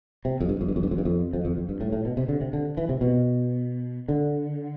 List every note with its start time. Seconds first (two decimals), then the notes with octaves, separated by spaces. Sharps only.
0.25 C3
0.40 F2
0.49 G2
0.61 F2
0.68 G2
0.76 F2
0.83 G2
0.91 F2
0.98 G2
1.05 F2
1.33 F2
1.45 F2
1.57 F2
1.69 G2
1.81 A2
1.93 A2
2.05 B2
2.17 C3
2.28 D3
2.41 C3
2.53 D3
2.77 E3
2.89 C3
3.01 B2
4.09 D3